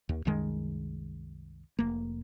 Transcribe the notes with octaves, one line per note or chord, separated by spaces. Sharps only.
D#2
C2 F#2 D#3 G#3
F1 A#3